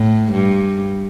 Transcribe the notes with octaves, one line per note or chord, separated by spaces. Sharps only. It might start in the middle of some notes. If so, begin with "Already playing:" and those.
Already playing: A2
G2